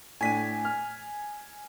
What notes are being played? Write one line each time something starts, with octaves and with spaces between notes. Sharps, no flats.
A2 D4 G#5 B6 D#7
F6